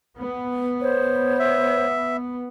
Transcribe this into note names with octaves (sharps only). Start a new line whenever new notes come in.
B3
C5 C#5
E5